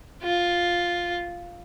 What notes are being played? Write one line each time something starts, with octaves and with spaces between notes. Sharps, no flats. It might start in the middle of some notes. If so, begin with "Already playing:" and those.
F4